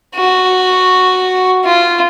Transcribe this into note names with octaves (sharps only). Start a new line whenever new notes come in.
F#4
F4